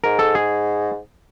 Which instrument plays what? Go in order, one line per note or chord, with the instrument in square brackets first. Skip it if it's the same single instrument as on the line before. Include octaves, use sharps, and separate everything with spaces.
[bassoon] G#2 [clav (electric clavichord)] A#4
[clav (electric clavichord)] A4
G#4